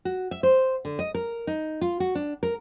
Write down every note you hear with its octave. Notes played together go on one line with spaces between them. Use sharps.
F#4
E5
C5
D3
D#5
A#4
D#4
F4
F#4
D4
A#4